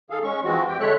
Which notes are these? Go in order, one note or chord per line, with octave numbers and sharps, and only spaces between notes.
D#3 G#4 A4 F5
G#3 C#4 C#6
E3 F3 G#3 C4 F#4
F2 G4 G5
D3 G#3 A4 C#5 E5 F#6